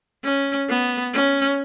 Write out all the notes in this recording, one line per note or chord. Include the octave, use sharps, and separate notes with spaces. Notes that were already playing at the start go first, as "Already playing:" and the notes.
C#4
B3
C#4